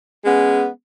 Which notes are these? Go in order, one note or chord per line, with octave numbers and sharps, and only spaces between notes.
G#3 B3 C#4